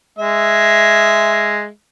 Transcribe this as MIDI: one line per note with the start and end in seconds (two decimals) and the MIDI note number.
0.19 1.67 56
0.19 1.67 76